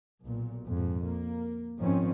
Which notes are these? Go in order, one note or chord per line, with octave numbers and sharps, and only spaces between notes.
B1 A#2
F2 G#2
A#3
F2 G#2 D#3 F3 C4 C#4